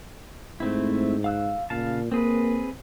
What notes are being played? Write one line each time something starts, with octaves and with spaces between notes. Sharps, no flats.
G#2 A3 C4 E4
F5 E6 F#6
A#2 C#3 F5 A5
A#3 C4 G#4 B4